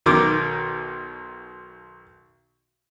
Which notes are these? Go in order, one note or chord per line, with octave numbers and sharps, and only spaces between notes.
B1 D#3 A#4 D6